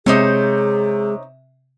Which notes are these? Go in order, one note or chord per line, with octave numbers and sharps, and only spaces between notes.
C3 G#3 D#4 G#4 C5 C#5